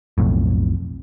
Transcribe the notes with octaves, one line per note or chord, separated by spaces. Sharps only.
B1 F2 A2